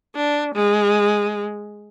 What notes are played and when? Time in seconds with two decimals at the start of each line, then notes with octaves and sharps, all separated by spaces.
0.16 D4
0.55 G#3